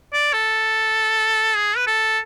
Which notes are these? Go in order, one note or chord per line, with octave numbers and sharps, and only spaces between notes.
D5
A4
G#4
B4
A4